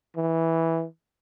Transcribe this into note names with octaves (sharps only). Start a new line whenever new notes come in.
E3